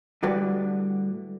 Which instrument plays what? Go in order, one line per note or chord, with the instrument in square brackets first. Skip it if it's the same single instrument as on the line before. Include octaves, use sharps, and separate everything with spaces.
[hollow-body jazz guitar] A2 D3 G3 F#4 B4 D5